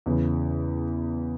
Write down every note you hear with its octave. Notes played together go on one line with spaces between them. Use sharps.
E2 C#3 E3